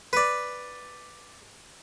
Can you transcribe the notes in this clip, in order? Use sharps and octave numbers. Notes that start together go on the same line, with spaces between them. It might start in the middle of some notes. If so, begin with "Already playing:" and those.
B4 D5